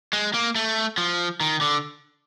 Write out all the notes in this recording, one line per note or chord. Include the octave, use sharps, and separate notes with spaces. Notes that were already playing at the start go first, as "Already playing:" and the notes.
G#3
A#3
A3
F3
D#3
D3